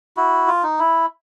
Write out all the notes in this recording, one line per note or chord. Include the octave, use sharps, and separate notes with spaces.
E4 F#4
F4
D#4
E4